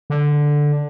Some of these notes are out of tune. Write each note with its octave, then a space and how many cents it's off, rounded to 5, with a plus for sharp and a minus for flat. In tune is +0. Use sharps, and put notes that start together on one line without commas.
D3 +0